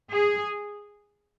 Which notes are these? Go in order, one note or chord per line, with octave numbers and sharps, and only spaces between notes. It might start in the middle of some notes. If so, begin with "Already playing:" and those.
G#4